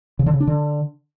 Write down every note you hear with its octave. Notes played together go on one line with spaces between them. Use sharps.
C#3
D3
C#3
D4
D3